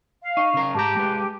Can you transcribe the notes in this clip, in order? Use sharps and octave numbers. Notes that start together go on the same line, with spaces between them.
F5
D#4 C#6
C#3 A#4
G#2 G4 A5 A#5 G6
G#3 B4